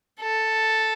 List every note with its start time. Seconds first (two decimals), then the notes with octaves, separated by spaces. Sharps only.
0.21 A4